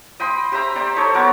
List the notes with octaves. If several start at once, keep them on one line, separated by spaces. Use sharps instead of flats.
D#5 G5 B5 C6
G4 C5 E5 A#5
C5 D5 G5 A#5
D#4 A4 C5 C#5
F#3 B3 A#4 D6